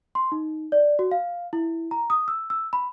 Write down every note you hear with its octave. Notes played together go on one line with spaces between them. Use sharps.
C6
D#4
D5
F#4
F5
E4
A#5
D#6
E6
E6
B5